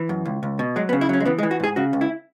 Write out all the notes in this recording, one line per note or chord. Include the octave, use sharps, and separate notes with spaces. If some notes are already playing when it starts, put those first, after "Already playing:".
Already playing: E3
F#2
C#2
C#2
B2
F#3 G#3
B3
C#3
E4
F#3 C#4
G#3
E3 B3
G#3
E3
F#4
G#2 G#4
C#3 F#4
C#2
E4